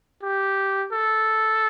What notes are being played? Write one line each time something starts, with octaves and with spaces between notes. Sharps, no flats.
G4
A4